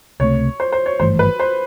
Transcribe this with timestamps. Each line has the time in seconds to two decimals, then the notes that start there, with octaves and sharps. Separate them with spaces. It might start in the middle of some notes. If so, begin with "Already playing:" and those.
0.20 C#2 C3 E3 A3 C#5
0.60 C5
0.72 C5
0.86 C#5
1.00 G#1 G2 E3 A3 C5
1.19 B4
1.40 C5